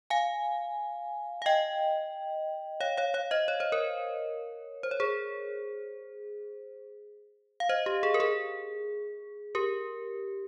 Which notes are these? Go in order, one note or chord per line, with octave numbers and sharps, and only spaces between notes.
F5 G#5
F5
D#5 G5
C#5 F5
C#5 F5
C#5 F5
C5 D#5
C#5
C5
A#4 C#5
C5
C#5
G#4 C5
F5
C5 D#5
G4
G#4
A#4
G#4
G4 A#4